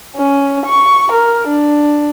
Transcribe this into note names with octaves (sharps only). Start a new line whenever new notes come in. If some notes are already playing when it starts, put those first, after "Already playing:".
C#4
C#6
A#4
D4